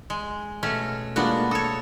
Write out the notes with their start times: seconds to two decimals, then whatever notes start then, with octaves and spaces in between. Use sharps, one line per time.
0.10 G#3
0.63 B2 A3 C#4
1.16 G#3 A#3 B3 D4 F4 F#4
1.51 A4 C#5 D#6